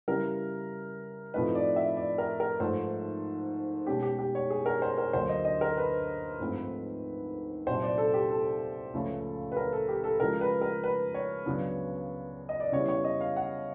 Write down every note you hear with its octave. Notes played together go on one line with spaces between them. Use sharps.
C#3 E3 G3 A#4
A2 F3 A3 C4 D#4 B4
D5
E5
D5
A#4
A#4
G#2 F3 A3 C5
B2 G#3 C#4 G4
G4
G4
C#5
G#4
A#4
C5
A#4
D2 D3 F#3 A#3 C5
D#5
D#5
A#4
B4
G#2 F3 A3 C4
C2 A#2 F#3 C5
D5
A4
G4
A4
C#2 C#3 F3 A3 C#4
B4
A#4
A4
G4
A4
C#3 F3 G#3 A#4
B4
A#4
B4
C#5
C#2 C#3 F#3 B3 D4
D#5
D5
C#3 E3 G3 B3 C#5
C#5
D#5
F5
F#5